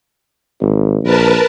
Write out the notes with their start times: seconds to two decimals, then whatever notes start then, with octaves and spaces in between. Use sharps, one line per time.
0.60 G#1
1.03 A#1 A#4 B4 A5